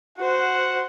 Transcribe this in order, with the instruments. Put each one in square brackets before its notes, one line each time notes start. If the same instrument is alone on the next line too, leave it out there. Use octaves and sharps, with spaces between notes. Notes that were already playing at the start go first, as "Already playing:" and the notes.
[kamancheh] F#4 C5 [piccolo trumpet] F#5